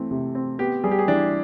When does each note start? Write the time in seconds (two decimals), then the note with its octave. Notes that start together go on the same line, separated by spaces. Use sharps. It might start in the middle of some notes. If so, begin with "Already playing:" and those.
Already playing: E3 A3 C4
0.11 C3
0.35 C4
0.59 B3 G4
0.84 G3 G#4
0.91 G4
0.99 G#4
1.08 E3 D4